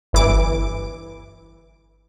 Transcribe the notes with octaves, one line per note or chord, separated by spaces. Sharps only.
G1 E3 D6 D7